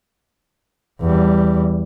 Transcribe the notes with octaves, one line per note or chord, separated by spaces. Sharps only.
E2 G3